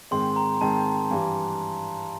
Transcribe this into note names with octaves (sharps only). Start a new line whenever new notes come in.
G#2 D#3 G#3 C4 C6
A#5
G#2 D#3 G#3 C4 A5
G2 E3 G3